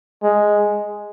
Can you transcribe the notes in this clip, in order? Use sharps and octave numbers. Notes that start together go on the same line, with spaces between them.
G#3